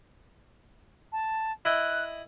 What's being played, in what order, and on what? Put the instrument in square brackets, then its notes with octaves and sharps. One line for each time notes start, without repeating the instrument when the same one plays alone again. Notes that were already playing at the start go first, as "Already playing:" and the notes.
[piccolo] A5
[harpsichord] E4 D#5 G5 [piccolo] F#6